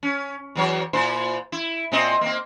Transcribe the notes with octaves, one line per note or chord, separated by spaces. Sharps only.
C#4
E2 F#3 C#5
A#2 E4 C5
E4
A#2 C4 D#5
A#3 C4